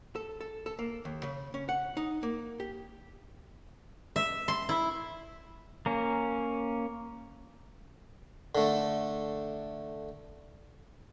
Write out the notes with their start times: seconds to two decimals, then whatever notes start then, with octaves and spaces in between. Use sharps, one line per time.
0.15 A4
0.41 A4
0.66 A4
0.79 A#3
1.05 D#2
1.23 C#3
1.54 C#4
1.69 F#5
1.97 D#4
2.23 A#3
2.60 G4
4.16 E5
4.48 C6
4.69 E4
5.86 A#3 C#4
8.55 D3 A3